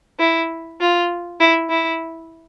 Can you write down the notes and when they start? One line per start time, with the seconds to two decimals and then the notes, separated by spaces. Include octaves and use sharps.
0.19 E4
0.80 F4
1.40 E4
1.70 E4